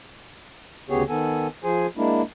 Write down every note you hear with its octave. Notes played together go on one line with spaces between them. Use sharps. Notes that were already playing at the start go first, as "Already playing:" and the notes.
D2 C#3 B3 G4 G#4 C#5
D#3 B3 A4 G#5
F3 G#4 C5 G#5
G#3 A#3 D4 E4